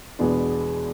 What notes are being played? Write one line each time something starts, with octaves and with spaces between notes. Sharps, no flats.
E2 B2 G#3 B3 D4